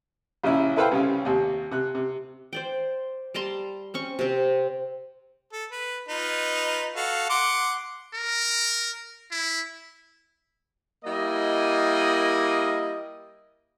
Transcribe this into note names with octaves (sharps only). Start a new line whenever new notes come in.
A#1 C#3 C#4 E4
E4 A4 B4 C5 F5 G5
C2 C#3 C#4
D#2 C3
C3 F#6
C3
C5 D5 G5
G3 A5 A#5 C6
C4 C#4 C#6
C3 C4
A4
B4
D#4 F4 B4
F#4 A4 F5
F#5 C6 D6
A#4
E4
G3 A#3 E4 D#5